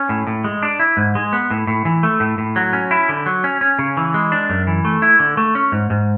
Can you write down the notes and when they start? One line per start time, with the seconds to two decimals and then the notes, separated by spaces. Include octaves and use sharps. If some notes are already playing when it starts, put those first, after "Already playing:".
Already playing: C#4
0.09 A2
0.27 A2
0.44 G#3
0.63 D4
0.79 E4
0.97 G#2
1.15 G#3
1.33 B3
1.50 A2
1.67 A2
1.85 E3
2.03 A3
2.20 A2
2.38 A2
2.56 F#3
2.73 C#4
2.91 E4
3.09 D3
3.26 F#3
3.44 C#4
3.61 C#4
3.79 C#3
3.97 E3
4.14 G#3
4.32 D4
4.50 F#2
4.67 E3
4.85 A3
5.02 E4
5.20 D3
5.37 A3
5.55 C#4
5.72 G#2
5.90 G#2